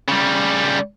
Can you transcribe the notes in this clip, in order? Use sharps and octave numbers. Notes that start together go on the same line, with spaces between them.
C#3 G3